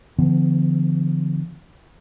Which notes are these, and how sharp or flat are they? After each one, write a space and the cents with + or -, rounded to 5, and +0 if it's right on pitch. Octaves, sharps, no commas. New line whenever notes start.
D3 +0 F3 -35 B3 +35